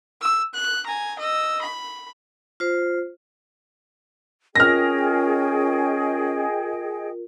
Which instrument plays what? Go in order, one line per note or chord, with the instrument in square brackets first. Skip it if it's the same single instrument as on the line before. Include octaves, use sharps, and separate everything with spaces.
[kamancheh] E6
F#6
G#5 A#5
D#5 E6
B5
[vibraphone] F4 C5
[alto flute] C#4 [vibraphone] F4 A#4 [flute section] G#4 D#5 G5 [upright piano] F6 A#6